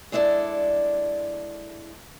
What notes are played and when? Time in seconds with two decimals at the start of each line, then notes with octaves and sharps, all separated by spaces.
0.12 G#3 D4 E4 A4 D5